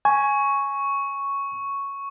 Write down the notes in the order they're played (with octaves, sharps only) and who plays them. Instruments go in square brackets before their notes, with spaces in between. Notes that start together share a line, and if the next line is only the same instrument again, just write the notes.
[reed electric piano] G#5 [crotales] C#6